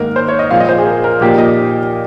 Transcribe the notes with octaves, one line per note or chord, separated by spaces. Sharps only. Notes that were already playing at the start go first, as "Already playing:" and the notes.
Already playing: G#2 D#3 A#3 A#4
C5
C#5
D#5
A#2 F3 G#3 C4 F5
D#5
C5
G#4
A#4
A#4
A#2 F3 A#3 D#4 G4
D#5